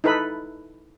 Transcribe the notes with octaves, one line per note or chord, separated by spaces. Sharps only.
D#4 E4 A4 B4 B5